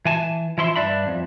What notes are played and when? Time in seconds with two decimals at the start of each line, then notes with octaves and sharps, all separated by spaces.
0.05 E3 G#5 A5
0.58 E3 F3 E4 E5 C6
0.76 G2 D4 E5 B5
1.07 F2